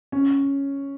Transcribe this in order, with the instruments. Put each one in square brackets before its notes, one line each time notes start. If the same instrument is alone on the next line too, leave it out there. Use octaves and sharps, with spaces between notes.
[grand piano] C#4